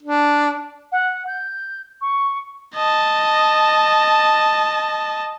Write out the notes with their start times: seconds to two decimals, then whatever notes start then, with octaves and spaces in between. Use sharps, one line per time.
0.03 D4
0.92 F#5
1.27 G6
2.01 C#6
2.76 D#5 A5